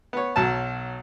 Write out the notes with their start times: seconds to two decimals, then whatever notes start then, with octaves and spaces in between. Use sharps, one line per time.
0.13 B3 C#5
0.36 B1 F#3 A5